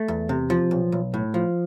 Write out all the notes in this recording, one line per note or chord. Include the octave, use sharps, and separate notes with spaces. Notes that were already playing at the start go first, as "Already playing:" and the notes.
Already playing: A3
E2
C3
F3
B1
B1
A2
F3